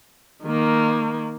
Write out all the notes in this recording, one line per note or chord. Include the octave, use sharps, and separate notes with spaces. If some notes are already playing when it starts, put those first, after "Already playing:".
D#3 A#3